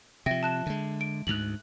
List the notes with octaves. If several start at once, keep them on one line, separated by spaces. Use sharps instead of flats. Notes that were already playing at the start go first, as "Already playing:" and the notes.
C3 F3 E5 G5 A#6
A5 F#6 E7
D3 G#3
D7
D2 G#2 F#6 F7 F#7